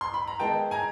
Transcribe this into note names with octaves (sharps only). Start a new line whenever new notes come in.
C6
B5
A#5
D#3 G#3 B3 G5 A5
G#5 A#5